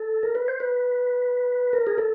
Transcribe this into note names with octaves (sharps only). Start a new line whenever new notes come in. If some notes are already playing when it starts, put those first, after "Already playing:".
Already playing: A4
A#4
B4
C5
B4
A#4
G#4
A4